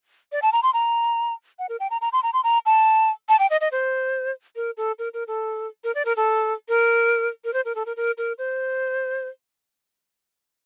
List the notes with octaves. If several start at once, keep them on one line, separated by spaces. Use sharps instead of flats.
D5
A5
A#5
C6
A#5
F#5
A#4
G5
A#5
A#5
C6
A#5
C6
A#5
A5
A5
G5
D#5
D#5
C5
A#4
A4
A#4
A#4
A4
A#4
D5
A#4
A4
A#4
A#4
C5
A#4
A4
A#4
A#4
A#4
C5